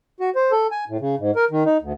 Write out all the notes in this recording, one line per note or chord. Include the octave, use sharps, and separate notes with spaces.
F#4
C5
A4
G#5
A2
C#3
G#2
A#4
D#3
D#4
D2